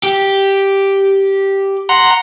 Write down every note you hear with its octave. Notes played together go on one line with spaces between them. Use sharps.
G4
F#5 A#5 C6